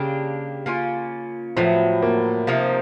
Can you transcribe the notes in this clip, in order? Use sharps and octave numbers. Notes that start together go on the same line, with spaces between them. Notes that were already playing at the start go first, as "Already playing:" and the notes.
Already playing: C#3 A#3 D4 G4
A#3 C#4 F4
A2 F3 F#3 B3
A#3
C3 F3 A#3 D#4